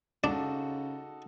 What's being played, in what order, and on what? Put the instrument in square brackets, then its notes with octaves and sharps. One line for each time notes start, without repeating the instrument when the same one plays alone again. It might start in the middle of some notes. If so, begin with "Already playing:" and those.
[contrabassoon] C#3 [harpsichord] D4 [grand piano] D#4 F#4 A4